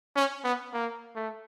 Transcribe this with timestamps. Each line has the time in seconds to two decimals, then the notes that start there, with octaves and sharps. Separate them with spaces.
0.16 C#4
0.44 B3
0.73 A#3
1.15 A3